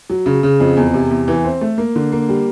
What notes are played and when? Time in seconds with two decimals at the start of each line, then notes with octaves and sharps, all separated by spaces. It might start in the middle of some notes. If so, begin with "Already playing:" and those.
0.10 F#3
0.26 C#3
0.43 C#3
0.60 F2
0.77 E2
0.94 C3
1.11 E2
1.28 E3
1.44 C4
1.61 A3
1.78 A#3
1.96 D3
2.12 A#3
2.29 G3